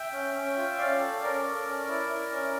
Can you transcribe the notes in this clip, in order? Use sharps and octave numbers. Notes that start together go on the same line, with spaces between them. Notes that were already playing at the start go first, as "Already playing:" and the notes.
Already playing: E5 G5
C#4
C#4
F4
C#4 D5 F5
A4
C#4 A#4 D5
A4
C#4
E4
E4
C#4